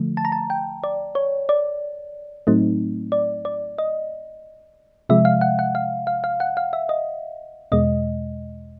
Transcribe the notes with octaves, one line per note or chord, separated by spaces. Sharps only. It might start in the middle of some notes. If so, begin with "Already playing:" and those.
Already playing: D3 F3 A3
A5
A#5
A5
G5
D5
C#5
D5
A2 F#3 A3 C4 D#4
D5
D5
D#5
C3 F3 G#3 E5
F5
F#5
F#5
F5
F5
F5
F#5
F5
E5
D#5
E2 B2 G#3 D#5